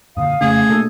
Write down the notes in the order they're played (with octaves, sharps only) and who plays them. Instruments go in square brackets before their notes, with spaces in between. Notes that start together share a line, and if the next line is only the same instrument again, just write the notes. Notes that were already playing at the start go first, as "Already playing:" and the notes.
[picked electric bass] F#2 A#2 D3 [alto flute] F5 [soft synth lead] D#6
[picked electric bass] F2 C#3 C#4 [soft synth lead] A3 [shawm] G#4
[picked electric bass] B2 A#3 D4 [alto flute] A4